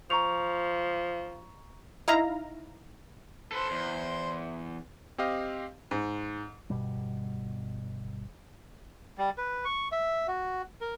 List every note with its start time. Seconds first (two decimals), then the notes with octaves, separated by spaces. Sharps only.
0.10 F3 A#5 C#6 F7
2.08 D#4 E4 F5 A#5
3.52 A4 B4 C5 C6
3.71 E2
5.18 C4 G4 D#5 F5
5.91 G#2
6.70 G1 B2 G3
9.18 G3
9.38 B4
9.65 C#6
9.92 E5
10.28 F#4
10.81 A#4